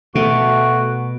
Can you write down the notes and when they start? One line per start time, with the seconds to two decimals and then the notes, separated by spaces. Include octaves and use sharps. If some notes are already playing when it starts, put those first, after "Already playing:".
0.15 B2 A3 F#4